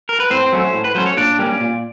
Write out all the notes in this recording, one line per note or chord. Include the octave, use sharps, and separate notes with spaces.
A#4
B4
A2 C4 C5
F#3 A3 C#4
A2
B4
F#3 A3 C#4 C5
C#5
A#2 D4 D5
G3 A#3 C#4
A#2